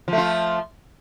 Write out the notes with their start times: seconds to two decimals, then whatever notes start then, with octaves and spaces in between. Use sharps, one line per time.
0.08 F3
0.13 A3
0.18 F4